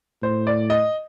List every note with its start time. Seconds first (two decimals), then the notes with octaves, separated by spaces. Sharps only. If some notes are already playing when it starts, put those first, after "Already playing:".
0.22 A2 C5
0.47 D5
0.70 D#5